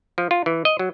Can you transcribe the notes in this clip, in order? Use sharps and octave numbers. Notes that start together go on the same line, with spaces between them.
F3
F4
E3
D#5
F#3